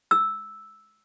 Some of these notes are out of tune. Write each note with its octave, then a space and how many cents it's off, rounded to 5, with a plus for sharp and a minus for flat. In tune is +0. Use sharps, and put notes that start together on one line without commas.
E6 -5